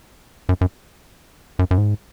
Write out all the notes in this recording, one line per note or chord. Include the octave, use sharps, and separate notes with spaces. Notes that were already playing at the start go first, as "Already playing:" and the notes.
F#2
F#2
F#2
F#2
G#2